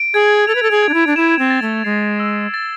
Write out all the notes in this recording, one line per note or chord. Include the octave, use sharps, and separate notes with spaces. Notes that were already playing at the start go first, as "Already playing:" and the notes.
Already playing: D7
G#4 G#6
A4 F7
B4
A4
G#4
G#6
D4
E4
D4
E4 E7
C4
A6
A3
G#3 C7
E6
A6